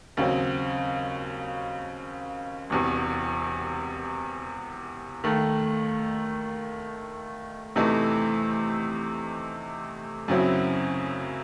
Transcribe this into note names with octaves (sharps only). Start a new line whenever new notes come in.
D#2 C#3 F#3 C4
E1 E2 C3
D#2 D#3 A3
E2 C3 E3 A3 D#4
F#2 C#3 F#3 C4 E4